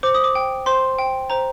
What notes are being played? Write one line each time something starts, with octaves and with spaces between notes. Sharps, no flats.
C5 D6
D#6
D6
G5
C5 C6
G5
C5 A#5